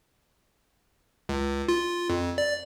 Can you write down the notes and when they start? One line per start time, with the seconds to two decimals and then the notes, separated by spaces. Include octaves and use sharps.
1.29 C#2
1.68 F4
2.10 F2
2.38 D5